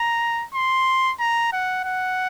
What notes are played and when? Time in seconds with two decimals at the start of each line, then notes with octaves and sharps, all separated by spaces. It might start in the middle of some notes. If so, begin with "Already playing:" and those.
Already playing: A#5
0.54 C6
1.20 A#5
1.53 F#5
1.85 F#5